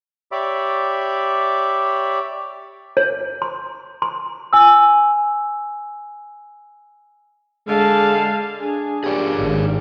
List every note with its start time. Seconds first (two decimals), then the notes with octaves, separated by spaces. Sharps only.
0.32 G4 C#5 D5 E5 B5 D6
2.97 C#5
3.42 C6
4.02 C6
4.53 G#5 E6
7.68 D3 G#3 F5 A5
8.60 D4 G#4
9.04 F3 A#3 G4 G#4 C#5 D5
9.37 G#1